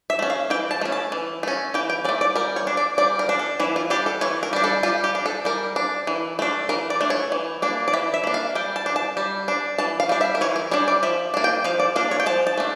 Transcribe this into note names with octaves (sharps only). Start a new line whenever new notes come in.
E5
A3 C#4
F5
E3 G5
A5
A3 C#4
A5
E3
A3 C#4
E3 G5
G5
C#4 D5
A3
D5
G3 A#4
C#5
D4
D5
G3 D5
A#4
D4
A4
E3 E4
F4
G3 D4 G4
A4
E3 C#5
A#4
G3 D4
A4
G3 F4
G4
D4
A4
G3 A#4
D4
E3
A3 D4
E3 A#4
D5
A3 D4
C#5
E3
A#3 D4
D5
E3 E5
E5
A#3 D4
F5
G3 G5
A5
D4
A5
G3
D4
E3 A5
F5
G3 D4
E5
A#4
E3 C#5
A#4
G3 D4 C#5
D5
F3 E5
A#3 D4
G5
F3 F5
D5
A#3 D4 A#4
C#5
G5
F3 A5
A5
A3 D4